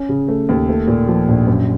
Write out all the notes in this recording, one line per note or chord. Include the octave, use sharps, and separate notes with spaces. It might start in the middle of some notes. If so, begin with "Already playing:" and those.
Already playing: C#4
C#3
A3
D#2
A3
A#2
F3
A#1
F#2